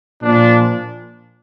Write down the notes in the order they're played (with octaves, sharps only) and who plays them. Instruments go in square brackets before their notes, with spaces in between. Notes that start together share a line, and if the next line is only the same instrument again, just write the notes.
[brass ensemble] A#2 F3 D4